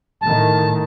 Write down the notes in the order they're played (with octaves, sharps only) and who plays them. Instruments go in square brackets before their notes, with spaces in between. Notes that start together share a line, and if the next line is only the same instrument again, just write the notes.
[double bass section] A2 D#3 [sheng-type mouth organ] A5